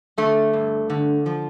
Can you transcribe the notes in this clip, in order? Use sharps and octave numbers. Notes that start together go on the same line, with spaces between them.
D3 A3
G2
D3
F3